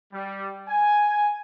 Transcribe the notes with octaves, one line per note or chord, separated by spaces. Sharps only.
G3
G#5